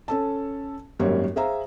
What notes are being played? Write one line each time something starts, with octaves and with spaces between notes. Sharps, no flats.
C#4 A4 A5
G#1 F#2 G3 A#3 C#5
G#4 C5 E5 F5 A#5